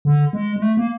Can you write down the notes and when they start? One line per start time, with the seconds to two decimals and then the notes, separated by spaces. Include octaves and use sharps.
0.05 D3
0.33 G#3
0.56 G#3
0.62 A3
0.77 A#3